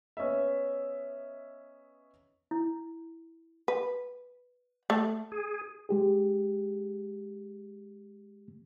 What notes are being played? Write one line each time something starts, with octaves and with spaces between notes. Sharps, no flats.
B3 C#4 D#5 E5
E4
B4
A3
G#4
G#3 G4 G#4